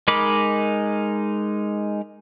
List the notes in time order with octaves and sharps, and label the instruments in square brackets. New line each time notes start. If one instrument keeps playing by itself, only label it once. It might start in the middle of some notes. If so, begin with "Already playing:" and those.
[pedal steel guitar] G#3 D#4 A#4 B5 D6